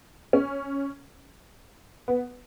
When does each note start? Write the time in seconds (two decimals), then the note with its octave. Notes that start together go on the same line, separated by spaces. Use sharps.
0.33 C#4
2.08 B3